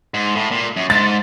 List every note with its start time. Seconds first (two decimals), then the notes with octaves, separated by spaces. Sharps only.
0.14 G#2
0.35 A2
0.51 A#2
0.76 F#2
0.90 G#2 A6